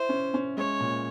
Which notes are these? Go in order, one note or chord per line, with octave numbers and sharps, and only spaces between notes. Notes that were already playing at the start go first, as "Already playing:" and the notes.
Already playing: E4 C5
C#4
C#4
G#3 C#5
A#2